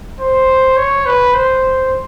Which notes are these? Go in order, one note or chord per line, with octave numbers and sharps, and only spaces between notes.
C5
C#5
B4
C5